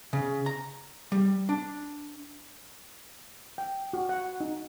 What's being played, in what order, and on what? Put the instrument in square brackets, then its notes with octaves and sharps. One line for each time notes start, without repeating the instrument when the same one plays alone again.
[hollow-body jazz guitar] C#3
A#5
G3
D4
[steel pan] G5
F#4
F#5
D#4